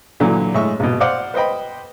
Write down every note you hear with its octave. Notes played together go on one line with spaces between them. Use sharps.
A#2 D3 E3 F#3
A2 G#3 E5 C#6
A#1 B2
C5 D5 F5 F#5 D6
B4 C5 D#5 G5 B5